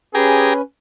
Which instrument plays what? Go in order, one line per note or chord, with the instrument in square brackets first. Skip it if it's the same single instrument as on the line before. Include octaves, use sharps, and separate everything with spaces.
[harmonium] C#4 B4 [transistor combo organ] G4 G#5 A#5 [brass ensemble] G#4